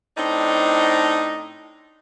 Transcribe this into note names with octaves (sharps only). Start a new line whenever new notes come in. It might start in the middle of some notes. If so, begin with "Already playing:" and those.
A2 C4 D4 D#4